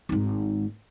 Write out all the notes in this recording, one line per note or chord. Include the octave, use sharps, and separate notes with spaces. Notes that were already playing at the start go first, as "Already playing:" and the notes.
G#1 G#2